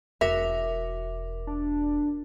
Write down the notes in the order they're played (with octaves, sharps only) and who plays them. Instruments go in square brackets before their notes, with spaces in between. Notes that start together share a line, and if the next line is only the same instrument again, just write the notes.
[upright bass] E1 [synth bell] F#4 A#4 D6 [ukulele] E5
[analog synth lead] D4